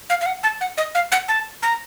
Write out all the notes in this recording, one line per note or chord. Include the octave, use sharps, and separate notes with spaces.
F5
F5
F#5
A5
F#5
D#5
F5
F#5
A5
A#5